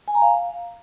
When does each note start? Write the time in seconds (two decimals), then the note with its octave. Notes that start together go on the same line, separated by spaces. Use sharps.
0.08 G#5
0.15 A#5
0.22 F5